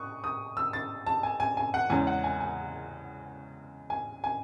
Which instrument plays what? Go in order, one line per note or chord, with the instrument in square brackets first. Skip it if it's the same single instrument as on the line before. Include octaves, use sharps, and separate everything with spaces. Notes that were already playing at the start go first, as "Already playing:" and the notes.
Already playing: [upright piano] C#6 D#6 F#6
D#6
E6
A6
A5
G#5
G#5
G#5
F#5
E2 C#3 G#3 C#4 G#5
F#5
G#5
G#5
G#5
G#5